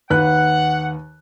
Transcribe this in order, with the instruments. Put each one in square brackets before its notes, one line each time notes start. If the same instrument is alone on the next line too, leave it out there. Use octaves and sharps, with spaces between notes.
[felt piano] D#2 B4 F#6 [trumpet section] F#5